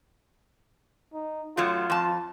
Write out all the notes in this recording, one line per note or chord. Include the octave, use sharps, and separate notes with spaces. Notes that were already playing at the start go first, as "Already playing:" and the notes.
D#4
F#2 F#3 A3 F4
F2 A5